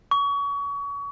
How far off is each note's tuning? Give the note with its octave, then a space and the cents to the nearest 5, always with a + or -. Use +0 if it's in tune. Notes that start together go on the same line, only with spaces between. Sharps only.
C#6 +30